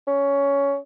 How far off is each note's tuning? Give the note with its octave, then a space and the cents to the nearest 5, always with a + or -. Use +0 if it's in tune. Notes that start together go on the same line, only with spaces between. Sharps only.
C#4 +15